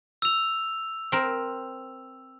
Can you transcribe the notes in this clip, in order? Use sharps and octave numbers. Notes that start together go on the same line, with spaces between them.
E6 F7
C4 A#4